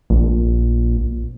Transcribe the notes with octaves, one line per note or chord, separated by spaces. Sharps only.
A#1